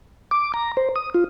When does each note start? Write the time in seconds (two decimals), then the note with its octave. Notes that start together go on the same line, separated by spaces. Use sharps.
0.31 D6
0.54 A#5
0.77 C5
0.96 D#6
1.14 F4